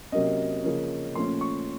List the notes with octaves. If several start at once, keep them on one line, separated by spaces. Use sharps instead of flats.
C3 F#3 A#3 C#4 D#5
C#3 F3 A#3 C#4
A#2 F3 A3 C#4 C6
C#6